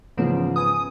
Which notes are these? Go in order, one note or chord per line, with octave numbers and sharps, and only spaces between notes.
G#2 C#3 E3 F3 B3 C#4
B4 G#5 D#6